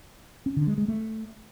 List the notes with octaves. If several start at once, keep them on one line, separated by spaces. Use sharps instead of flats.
C#4
D3
G#3
G#3
A3